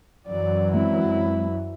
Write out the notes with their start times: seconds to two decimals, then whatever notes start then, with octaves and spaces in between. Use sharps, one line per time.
0.27 F#2 E3 F#3 D5
0.74 G#3 C4 E4